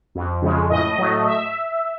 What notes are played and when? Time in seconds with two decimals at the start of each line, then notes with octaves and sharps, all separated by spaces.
0.15 F2
0.42 C#3 F3 G#3
0.70 A2 D#5
0.98 F#3 A3
1.26 E5